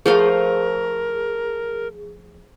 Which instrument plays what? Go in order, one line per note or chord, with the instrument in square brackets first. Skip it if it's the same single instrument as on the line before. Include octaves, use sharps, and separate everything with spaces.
[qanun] F3 A3 F5 [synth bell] G#4 [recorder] A#4